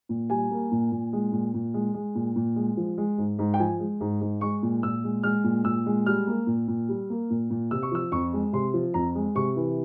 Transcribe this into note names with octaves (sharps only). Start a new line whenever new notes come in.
A#2
G3 G#5
A#3
A#2
A#2
G#3
A#2
A#2
G#3
G#3
A#2
A#2
G#3
F3
G#3
G#2
G#2
G5
F3 G#5
G#3
G#2
G#2
G#3 C#6
A#2
A#2 E6
G#3
G#3 F6
A#2
A#2 E6
G#3
G3 F6
A#3
A#2
A#2
G3
A#3
A#2
A#2
C3 E6
C#6
F3 E6
F2 C#6
G#3
C3 C6
F3
F2 A#5
G#3
C3 C#6
E3